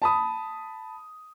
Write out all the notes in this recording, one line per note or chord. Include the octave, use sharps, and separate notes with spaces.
A5 B5 D#6